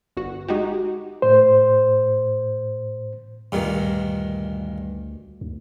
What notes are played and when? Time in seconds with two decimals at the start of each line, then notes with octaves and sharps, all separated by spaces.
0.17 G1 F#4
0.48 G#3 D#4 F#4 G4
1.22 A2 C5
3.52 D2 G2 A#2 D#3
5.41 D2